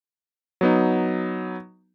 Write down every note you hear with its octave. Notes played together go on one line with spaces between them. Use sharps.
F#3 B3 D#4